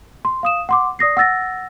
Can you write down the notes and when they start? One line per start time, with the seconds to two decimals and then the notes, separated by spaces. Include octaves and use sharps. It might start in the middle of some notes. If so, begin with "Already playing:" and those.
0.25 C6
0.43 F5 D#6 E7
0.69 F#5 C6 D6
0.99 D5 D#6 A#6 C7
1.17 F#5 E6 A6 A#6